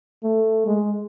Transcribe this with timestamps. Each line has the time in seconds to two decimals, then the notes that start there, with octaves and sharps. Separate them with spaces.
0.23 A3
0.66 G#3